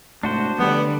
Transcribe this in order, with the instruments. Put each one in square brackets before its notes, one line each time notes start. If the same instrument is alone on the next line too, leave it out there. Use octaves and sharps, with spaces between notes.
[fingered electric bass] G#2 C3 A3 [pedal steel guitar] D4 F#4 C5
[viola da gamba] D3 G3 [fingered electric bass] F3 A3 [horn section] B3